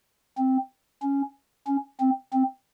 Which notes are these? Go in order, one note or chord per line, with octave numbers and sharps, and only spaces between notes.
C4
C#4
C#4
C4
C4